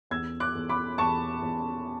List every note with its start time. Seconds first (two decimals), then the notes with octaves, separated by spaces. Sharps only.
0.11 E2 E6 G#6
0.40 D6 F#6
0.55 E2
0.69 B5 D6
0.98 E2 A5 C#6
1.42 E2